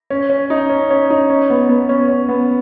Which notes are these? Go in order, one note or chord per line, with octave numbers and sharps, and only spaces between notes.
C#4
C#4
D#4
C#4
C#4
D#4
C#4
B3
B3
C#4
C#4
B3